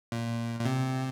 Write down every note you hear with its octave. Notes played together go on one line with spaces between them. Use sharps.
A#2
A#2
C3